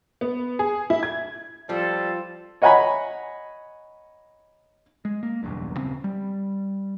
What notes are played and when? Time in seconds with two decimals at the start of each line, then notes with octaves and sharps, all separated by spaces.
0.21 B3
0.59 G#4
0.90 E4
1.03 G#6
1.69 F3 G3 C4 F4 A4 C5
2.62 C#5 D#5 F#5 G#5 A#5 B5
5.05 G#3
5.23 A#3
5.43 F#1 B1 E2 G2
5.77 D#1 C#3 C4
6.04 G3